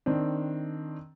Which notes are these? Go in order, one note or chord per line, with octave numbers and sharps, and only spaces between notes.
D#3 C4 D4